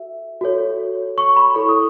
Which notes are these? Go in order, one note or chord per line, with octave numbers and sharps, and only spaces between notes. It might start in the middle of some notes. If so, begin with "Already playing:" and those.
Already playing: F#4 A4 E5
F#4 A4 C#5
C#6
B5
E4 A4 C#5 C#6
D#6